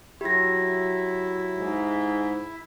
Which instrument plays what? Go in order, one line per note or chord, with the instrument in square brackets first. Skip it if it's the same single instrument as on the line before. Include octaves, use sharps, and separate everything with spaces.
[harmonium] F#3 [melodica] E4 E5 [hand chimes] G4 A#6
[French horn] G#2